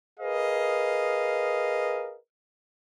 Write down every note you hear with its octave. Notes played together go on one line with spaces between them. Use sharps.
G#4 A#4 B4 D#5 F5